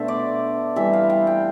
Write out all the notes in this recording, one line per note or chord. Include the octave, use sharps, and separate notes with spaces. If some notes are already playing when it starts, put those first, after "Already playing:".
Already playing: B2 A3 D4 A4 C5 E5
D5
E3 G3 C4 E5
F5
G5
G5